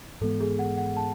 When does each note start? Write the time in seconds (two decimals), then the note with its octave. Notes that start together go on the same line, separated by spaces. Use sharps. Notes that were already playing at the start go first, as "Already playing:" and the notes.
0.21 G#2 E3 G#3 B3 A4
0.40 G#4
0.59 F#5
0.77 F#5
0.97 A5